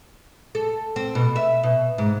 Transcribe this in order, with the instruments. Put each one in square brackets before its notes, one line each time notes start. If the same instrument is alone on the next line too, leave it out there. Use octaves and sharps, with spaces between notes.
[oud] A4
C4
B2
E5
B2
G#2